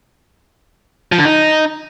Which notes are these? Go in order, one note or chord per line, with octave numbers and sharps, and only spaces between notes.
F3
D3
D#4